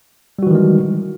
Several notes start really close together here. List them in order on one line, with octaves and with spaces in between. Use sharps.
G3 F#4 E3 D#3 G#3